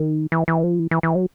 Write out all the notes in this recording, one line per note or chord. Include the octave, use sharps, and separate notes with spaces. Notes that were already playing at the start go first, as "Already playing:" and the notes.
Already playing: D#3
E3
E3
F3
E3
E3
E3
F#3